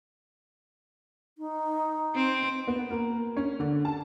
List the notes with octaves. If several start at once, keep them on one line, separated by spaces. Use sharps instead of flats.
D#4
C4
B3
A#3
C#4
D3
A5